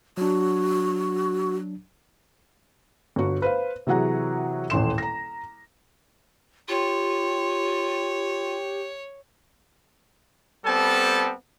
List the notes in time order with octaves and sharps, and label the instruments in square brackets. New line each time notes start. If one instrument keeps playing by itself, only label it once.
[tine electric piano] F#3 D4 [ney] F#4
[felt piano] G1 F#4
B4 C5 F5
C3 E3 F#3 G#4 F#5 A#5
D#1 A1 C6 E7
A#5 A#6
[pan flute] F4 [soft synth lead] G4 [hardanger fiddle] C#5
[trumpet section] G3 B3 C4 A4 A5